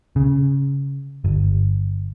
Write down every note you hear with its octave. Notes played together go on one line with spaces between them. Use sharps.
C#3
G1